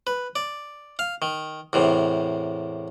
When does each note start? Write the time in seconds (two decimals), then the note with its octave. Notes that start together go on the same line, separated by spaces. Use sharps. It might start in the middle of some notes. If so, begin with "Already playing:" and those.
0.07 B4
0.36 D5
0.99 F5
1.22 D#3
1.73 E2 A2 C3